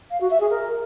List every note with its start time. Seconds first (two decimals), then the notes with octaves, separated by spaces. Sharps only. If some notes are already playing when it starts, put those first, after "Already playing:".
0.11 F5
0.21 F#4
0.30 E5
0.40 G#4
0.50 A#4